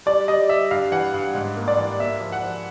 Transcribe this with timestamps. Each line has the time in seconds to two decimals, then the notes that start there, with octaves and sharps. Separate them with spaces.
0.06 G3 D5
0.28 G3 D#5
0.49 G3 E5
0.71 G2 F5
0.92 E3 F#5
1.14 G2
1.35 G#2
1.57 A#3
1.68 D5
1.78 E3
1.99 A#3 E5
2.21 F3
2.32 F#5
2.43 F3